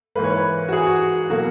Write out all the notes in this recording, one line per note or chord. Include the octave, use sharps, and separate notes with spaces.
G#2 E3 A#3 B4
C#5
B4
F#4
G#4
F#4
B2 F#3 A#3 F#4